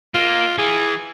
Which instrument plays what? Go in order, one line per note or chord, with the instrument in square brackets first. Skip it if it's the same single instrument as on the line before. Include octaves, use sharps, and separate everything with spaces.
[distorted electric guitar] A#3 [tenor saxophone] F4
[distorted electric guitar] E3 [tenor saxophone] G#4